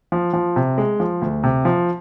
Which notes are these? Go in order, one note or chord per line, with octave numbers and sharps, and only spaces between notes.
F3
F3
C3
G#3
F3
D2
C3
F3